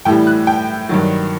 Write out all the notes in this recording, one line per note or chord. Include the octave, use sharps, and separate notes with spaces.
A2 E3 G3 G5
F#6
G5
G2 D#3 F#3